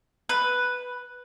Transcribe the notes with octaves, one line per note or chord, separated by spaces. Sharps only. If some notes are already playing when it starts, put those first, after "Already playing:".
B4